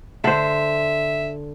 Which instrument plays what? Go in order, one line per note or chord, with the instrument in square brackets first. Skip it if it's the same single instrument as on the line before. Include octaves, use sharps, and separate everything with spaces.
[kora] D3 C5 [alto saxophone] E5